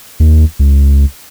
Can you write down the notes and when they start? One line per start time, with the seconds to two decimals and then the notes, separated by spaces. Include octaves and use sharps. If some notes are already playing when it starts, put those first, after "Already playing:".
0.20 D#2
0.59 C#2